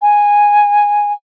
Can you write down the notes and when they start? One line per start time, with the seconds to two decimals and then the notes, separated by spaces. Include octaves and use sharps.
0.02 G#5